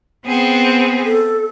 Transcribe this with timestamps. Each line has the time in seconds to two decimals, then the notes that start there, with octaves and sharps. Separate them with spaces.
0.25 B3 C4 G#4
1.05 A4